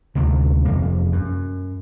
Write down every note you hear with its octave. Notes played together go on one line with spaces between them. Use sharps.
D2 C3 D#3
F1 F2 A#3
F#2